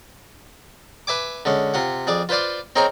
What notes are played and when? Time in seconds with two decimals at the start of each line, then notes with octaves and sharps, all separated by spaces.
1.07 B4 E5 G#5 D6
1.45 D3 G#3 C#4
1.74 C3 F4 F#5
2.07 F2 G#4 D5
2.29 F4 B4 C5 D5 F5
2.76 C4 D#4 G#4 A#4 C5 C#5